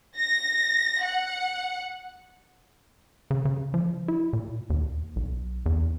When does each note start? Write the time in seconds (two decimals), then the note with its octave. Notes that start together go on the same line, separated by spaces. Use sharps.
0.18 A#6
1.04 F#5
3.31 C#3
3.45 C#3
3.74 F3
4.08 E4
4.33 A#2
4.70 D#2
5.16 B1
5.66 E2